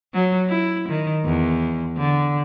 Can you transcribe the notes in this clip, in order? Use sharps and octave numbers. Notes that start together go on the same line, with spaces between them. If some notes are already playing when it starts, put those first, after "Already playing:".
F#3
E4
D#3
E2
D3